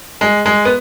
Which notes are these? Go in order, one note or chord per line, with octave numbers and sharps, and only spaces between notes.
G#3
G#3
B3